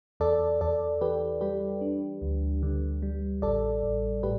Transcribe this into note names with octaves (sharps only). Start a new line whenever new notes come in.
E2 A4 D5
E2 A4 D5
E3 G4 B4
G3 G4 B4
D4
D2
D3
G3
A1 A4 D5
A1
A2 G4 B4